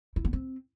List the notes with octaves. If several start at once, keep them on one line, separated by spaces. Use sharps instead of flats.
E4
B3
C4